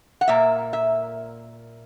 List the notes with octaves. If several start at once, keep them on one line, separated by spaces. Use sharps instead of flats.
F#5
A#2 A#3 E5
E5